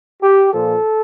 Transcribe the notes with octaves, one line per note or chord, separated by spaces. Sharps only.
G4
A#2 F3 A4